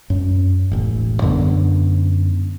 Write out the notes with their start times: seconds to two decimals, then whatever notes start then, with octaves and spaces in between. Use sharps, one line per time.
0.10 F#2
0.72 E1 A1
1.22 F#2 D3 B3